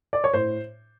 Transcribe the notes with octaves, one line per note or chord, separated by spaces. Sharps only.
D5
C#5
A2 C5